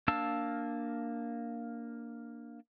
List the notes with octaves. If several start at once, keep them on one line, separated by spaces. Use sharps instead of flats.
A#3 D4 F5 A5 E6